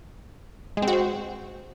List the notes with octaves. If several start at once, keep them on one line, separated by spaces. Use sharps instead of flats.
G#3
C4
F#4
C4